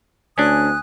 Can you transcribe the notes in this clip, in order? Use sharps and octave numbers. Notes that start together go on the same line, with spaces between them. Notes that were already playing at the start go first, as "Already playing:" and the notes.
D2 C#4 D4 G#5 D#6 F#6